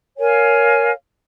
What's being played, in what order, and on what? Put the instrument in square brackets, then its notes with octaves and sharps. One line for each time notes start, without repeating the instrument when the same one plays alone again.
[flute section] A#4 C#5 F5 G#5